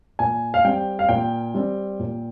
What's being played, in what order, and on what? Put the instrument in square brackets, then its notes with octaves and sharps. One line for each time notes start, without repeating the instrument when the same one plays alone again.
[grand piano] A#2 G#5
F5
G3 C4 G5
F5
A#2 G5
G3 C4
A#2